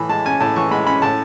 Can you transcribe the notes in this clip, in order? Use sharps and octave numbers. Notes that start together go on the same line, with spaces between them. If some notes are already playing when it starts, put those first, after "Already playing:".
Already playing: A2 E3 B5
G#3 A5
C#4 G#5
A2 A5
E3 C#6
G#3 B5
C#4 B5
A2 A5